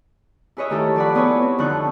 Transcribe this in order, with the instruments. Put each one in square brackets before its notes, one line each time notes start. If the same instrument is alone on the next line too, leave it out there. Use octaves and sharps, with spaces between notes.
[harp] E4 G#4 B4 C#5 D#5 E5
D#3 A3 E4 G4 A4
F3 C#5 D5 F#5 B5
B3 E4 G#4 B4 C#5
C4
F2 D3 D#4 C#6 F#6 G6